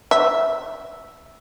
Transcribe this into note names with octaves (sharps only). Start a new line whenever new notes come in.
E5